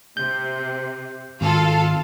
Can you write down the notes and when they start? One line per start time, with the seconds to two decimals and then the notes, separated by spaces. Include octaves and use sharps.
0.17 C3 G6
1.41 G#1 F4 A4 F5